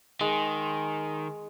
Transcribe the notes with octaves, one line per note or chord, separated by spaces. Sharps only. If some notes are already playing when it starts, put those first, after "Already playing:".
D#3 G#3